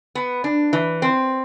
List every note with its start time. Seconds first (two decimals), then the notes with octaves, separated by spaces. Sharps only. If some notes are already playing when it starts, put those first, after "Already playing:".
0.15 B3
0.44 D4
0.73 E3
1.02 C4